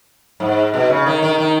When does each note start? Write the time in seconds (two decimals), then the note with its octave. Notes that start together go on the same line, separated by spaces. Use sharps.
0.40 G#2
0.74 B2
0.90 C#3
1.06 D#3
1.23 D#3
1.38 D#3